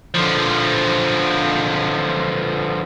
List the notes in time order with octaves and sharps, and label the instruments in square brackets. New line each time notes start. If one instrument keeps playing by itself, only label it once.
[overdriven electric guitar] D3 F3